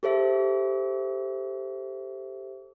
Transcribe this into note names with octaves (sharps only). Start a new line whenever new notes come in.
G4 A4 C5 E5